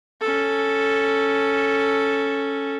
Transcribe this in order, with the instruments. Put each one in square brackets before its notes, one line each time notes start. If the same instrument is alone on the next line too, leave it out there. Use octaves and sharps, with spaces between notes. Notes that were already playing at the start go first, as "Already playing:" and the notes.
[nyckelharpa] C#4 A4